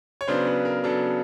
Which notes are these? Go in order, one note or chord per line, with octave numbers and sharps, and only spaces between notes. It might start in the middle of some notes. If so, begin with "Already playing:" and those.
C#5
C#3 F#3 B3 D4 C5
B4
A#4
C#3 F#3 B3 D4 A4